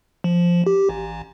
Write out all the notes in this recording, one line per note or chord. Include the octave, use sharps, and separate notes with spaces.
F3
G4
A1